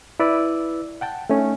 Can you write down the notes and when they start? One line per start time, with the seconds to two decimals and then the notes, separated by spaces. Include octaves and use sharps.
0.20 E4 B4 D5 E6
1.01 F#5 G5 A5
1.30 A3 C#4 D#4